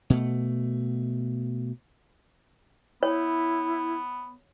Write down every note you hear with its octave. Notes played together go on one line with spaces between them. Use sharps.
B2 A3
B3 E4 C#5